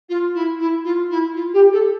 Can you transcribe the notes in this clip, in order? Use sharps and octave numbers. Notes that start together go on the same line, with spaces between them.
F4
E4
E4
F4
E4
F4
G4
A4